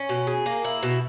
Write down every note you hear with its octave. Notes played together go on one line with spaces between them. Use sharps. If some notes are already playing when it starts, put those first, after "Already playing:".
Already playing: C#4
B2
G#4
A#3
E4
B2